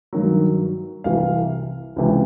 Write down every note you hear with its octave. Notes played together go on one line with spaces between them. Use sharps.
G2 D#3 F#3
C2 C3 E3 F5
C#2 C3 E3